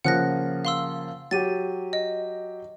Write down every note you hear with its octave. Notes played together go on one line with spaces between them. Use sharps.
C#3 F3 A#3 F#5 F#6 A#6
F5 C6 E6
F#3 G4 A6 D#7
D#5